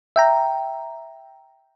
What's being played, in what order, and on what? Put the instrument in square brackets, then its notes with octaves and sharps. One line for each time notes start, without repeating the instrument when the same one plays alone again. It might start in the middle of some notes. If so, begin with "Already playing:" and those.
[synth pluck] E5 G5 A#5